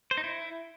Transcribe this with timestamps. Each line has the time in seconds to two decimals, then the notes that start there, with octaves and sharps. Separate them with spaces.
0.11 C5
0.17 D#4
0.24 E4